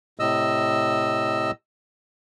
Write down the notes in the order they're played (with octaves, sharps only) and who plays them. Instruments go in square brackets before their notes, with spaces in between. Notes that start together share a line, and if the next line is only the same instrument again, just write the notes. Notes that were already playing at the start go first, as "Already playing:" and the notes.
[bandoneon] A2 C3 D#5 E6